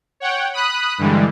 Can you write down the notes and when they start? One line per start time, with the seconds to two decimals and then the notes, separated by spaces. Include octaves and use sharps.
0.20 C#5 F#5 G5
0.53 B5 D#6 F#6
0.98 G2 D3 E3 G3 G#3